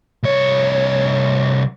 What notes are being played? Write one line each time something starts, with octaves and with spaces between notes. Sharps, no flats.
C2 C#5